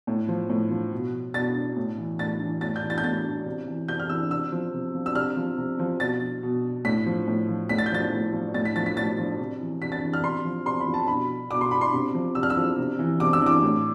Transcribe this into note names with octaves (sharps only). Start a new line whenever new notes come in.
A2
F3
A2
F3
B2
B2 A6
A2
E3
A2 A6
E3
A2 A6
G6
E3
A6
G6
A2 A6
E3
C3
E3
C3 G6
F6
E3 E6
C3 E6
F3
C3
F3
E6
C3 F6
F3
C3
F3
B2 A6
B2
A2 B6
F3
A2
F3
A2 B6
A6
G6
F3 A6
A2
F3
A2 A6
B6
F3 A6
B6
A2 A6
F3
C3
E3
C3 B6
A6
E3
F6
C3 C6
F3
C3 C6
B5
F3
A5
B2 B5
B2 D6
C6
B5
C6
C3
F3
C3 E6
F6
E6
F3
C3
E3
C3 D6
E6
E3
D6
A2